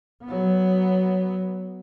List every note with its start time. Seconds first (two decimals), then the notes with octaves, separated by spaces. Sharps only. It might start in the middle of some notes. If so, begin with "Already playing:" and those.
0.24 F#3 B3